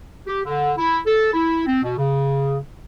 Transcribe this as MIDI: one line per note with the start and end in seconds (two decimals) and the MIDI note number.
0.27 0.40 67
0.45 0.72 50
0.77 1.00 64
1.06 1.32 69
1.33 1.62 64
1.66 1.82 60
1.83 1.97 47
1.97 2.57 49